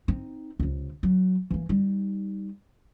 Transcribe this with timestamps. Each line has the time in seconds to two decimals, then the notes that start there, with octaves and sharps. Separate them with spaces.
0.08 C4 D#4
0.59 C#2 C3
1.03 F#3
1.50 E3 A#3
1.69 G3 D#4